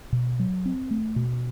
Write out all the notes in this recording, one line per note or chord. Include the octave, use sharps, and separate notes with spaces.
B2
F#3
C4
A3
B2